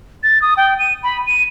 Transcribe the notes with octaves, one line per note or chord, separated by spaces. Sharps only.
A6
D#6
G5
D#7
B5
D#7